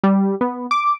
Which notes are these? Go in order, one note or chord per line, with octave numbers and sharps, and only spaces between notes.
G3
B3
D6